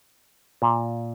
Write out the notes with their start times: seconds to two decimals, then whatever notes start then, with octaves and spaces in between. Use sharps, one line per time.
0.62 A#2